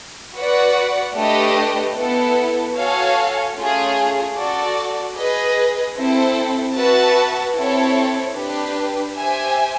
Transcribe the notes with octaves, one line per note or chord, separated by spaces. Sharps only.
F#4 B4 D5 F#5
A3 D4 G4 B4 D#5
B3 E4 A4
F#4 A4 C#5 F5 G#5
A3 C#4 F4 G#4
F#4 A4 D5
G#4 B4 D#5
C4 E4 A4
F#4 B4 E5 A5
C4 E4 A4 C#5
D4 G4 B4
G4 C5 E5 G#5